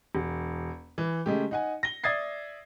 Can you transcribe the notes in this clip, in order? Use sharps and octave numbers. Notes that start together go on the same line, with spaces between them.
E1
E3
C#3 G#3 A3 G4
D#4 F#5 G#5
A#6 G7
D5 E5 D#6 G#6 A6 C7